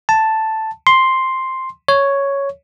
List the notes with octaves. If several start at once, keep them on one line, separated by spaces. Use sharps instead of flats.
A5
C6
C#5